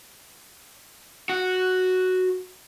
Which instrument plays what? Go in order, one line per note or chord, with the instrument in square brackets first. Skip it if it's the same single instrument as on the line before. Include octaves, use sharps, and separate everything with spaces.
[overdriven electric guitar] F#4